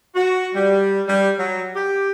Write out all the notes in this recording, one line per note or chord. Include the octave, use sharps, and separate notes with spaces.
F#4
G3
G3
F#3
G4